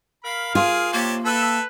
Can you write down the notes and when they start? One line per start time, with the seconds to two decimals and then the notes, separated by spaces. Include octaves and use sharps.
0.24 A#4 F5 B5
0.55 F4 G#4
0.93 C3 A#3 G4 C#5 A5
1.25 A4 B4 E5